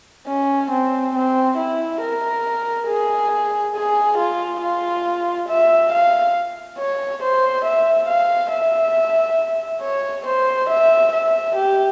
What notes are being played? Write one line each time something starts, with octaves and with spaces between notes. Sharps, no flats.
C#4
C4
C4
E4
A#4
G#4
G#4
F4
F4
E5
F5
C#5
C5
E5
F5
E5
C#5
C5
E5
E5
G4